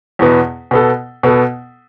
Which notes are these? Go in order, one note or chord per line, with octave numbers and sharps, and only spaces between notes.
E2 B2 B3
B2 B3 A4
B2 B3 A4